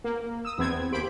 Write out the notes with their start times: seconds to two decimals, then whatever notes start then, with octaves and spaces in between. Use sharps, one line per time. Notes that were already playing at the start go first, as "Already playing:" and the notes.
0.04 A#3
0.45 D#6 E6
0.58 E2 B3 C4 G#6
0.92 D#2 G4 C5 B5 D7